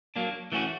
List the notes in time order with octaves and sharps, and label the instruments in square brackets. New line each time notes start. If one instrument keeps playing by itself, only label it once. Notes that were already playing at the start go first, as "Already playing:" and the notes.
[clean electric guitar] F#3 A#3 D4
E3 A3 C#4 F#4